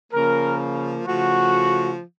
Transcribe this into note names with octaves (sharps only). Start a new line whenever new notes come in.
C#3 F3 A#3 A#4
C#3 F3 A3 F#4